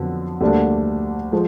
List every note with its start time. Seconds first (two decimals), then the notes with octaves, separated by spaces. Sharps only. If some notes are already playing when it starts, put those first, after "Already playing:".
Already playing: F2 D3 F#3 B3
0.41 D2 D3 G3 A#3 D4
1.32 F3 G#3